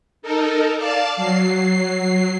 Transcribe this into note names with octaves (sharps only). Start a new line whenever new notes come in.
D#4 A4 A#4
D5 F5 A5
F#3 C7